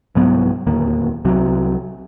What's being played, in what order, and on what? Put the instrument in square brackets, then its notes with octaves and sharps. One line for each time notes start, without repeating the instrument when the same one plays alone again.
[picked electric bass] C2 G#2 F#3 B3
D1 D#2 A#3
C2 C3 F#3